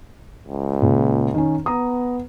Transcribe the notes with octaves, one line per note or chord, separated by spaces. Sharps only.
C#2
A#2 C#3
D#3 C#4
B3 A#5 D#6